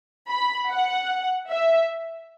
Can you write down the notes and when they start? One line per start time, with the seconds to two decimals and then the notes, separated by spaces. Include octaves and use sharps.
0.27 B5
0.69 F#5
1.49 E5